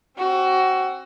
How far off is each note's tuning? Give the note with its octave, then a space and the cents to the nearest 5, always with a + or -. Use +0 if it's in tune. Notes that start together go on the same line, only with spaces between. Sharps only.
C4 +35 F#4 +20